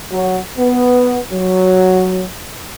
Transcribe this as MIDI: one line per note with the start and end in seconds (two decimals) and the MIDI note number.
0.12 0.40 54
0.57 1.18 59
1.32 2.23 54